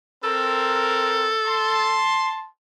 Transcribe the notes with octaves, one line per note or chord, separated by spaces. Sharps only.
C4 A4 A#4
A5 C6